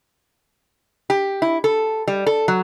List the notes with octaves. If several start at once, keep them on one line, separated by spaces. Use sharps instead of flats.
G4
E4
A4
G3
A4
F#3